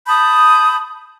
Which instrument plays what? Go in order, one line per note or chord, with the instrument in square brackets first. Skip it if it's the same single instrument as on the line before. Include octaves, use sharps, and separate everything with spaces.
[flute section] A5 B5 D#6 G6